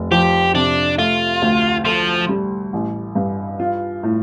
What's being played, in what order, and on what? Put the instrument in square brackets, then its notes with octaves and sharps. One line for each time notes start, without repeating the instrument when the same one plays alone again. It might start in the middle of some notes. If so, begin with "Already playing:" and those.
Already playing: [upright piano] F1
[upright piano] F3 [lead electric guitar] G4
[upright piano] C3 [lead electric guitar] D4
[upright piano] A3 [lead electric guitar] F4
[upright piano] D2
[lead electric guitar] F3 [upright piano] A4
[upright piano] G3
A1
G2
F4
A2